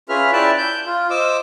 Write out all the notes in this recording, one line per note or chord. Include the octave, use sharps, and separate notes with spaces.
C#4 F4 G#4 B4 E5 F6
E4 D5 E5 G5 A5 F#6
G6
F4
C5 D#5 D6 E6